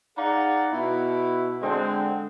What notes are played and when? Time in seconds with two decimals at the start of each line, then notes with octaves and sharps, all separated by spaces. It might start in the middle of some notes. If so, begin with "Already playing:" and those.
0.17 D#4 G#4 D5 F5 F#5 A#5
0.72 B2 E4
1.63 D3 G#3 C4